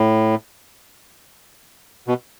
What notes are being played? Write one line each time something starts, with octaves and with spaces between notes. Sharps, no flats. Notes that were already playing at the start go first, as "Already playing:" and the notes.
Already playing: A2
B2